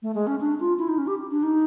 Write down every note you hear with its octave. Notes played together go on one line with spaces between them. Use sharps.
A3
G#3
C#4
D4
F4
E4
D#4
C#4
G4
D4
D#4